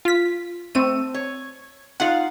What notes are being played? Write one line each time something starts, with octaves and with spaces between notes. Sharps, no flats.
F4 B6
A3 C4 D#7
C#5
D#4 F4 F5 F#5